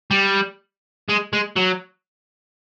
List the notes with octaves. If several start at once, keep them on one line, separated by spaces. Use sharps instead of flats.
G3
G#3
G#3
F#3